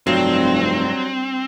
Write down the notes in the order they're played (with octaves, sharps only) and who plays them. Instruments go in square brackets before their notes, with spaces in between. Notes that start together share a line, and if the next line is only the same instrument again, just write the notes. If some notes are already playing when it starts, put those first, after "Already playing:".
[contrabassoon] F1 [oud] G2 [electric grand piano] F#3 [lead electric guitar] C4